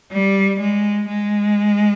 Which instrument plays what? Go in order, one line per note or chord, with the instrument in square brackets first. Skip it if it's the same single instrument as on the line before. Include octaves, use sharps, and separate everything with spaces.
[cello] G3
G#3
G#3